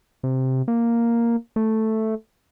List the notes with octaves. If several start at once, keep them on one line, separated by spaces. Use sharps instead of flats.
C3
A#3
A3